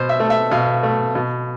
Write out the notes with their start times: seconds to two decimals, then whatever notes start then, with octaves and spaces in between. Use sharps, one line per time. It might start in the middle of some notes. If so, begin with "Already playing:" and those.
Already playing: B2 C5
0.09 E5
0.20 A3
0.30 E5
0.51 B2 F5
0.83 A3
1.15 B2